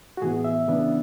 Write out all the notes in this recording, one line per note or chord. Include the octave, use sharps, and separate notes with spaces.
F#4
A2 E3 B3 G#4
E5
C#3 E3 B3 D4